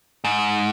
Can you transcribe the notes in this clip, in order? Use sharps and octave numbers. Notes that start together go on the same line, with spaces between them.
G#2